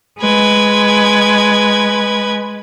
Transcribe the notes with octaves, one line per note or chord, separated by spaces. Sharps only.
G#3 B4 G#6